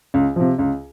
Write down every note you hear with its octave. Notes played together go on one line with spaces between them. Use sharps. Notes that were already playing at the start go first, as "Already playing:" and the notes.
C#2
C3 F3
C#2